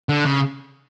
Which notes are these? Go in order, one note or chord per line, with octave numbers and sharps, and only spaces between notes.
D3
C#3